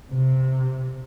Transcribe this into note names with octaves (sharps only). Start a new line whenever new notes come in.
C3